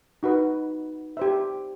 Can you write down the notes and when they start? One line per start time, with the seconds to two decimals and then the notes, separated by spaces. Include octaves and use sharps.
0.23 D#4 F#4 B4
1.17 G4 C5 E5